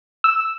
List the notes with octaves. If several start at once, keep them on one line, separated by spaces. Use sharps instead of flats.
E6